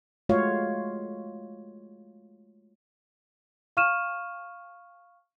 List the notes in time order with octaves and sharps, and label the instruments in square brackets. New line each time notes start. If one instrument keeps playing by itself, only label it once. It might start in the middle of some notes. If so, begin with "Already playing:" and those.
[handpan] G#3 A3 F4 F#4 C#5 F5
[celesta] F5 C#6 F6 D#7 E7